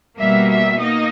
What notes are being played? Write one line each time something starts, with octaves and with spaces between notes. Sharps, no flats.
B2 G3 A#3 E5
E5
A#3 D#4 D#5